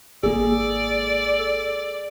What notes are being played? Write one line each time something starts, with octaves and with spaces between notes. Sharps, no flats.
G#1 A#3 G#4 A4 D5